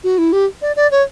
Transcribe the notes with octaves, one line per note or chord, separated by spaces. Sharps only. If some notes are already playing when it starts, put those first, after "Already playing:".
F#4
E4
G4
D5
D5
C#5